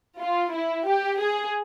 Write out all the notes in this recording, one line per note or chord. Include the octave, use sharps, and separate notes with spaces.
F4
E4
G4
G#4